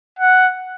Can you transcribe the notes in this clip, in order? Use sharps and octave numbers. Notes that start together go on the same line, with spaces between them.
F#5